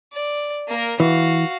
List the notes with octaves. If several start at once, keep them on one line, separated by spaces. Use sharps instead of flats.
D5
A#3 A#4
E3 F#4 F5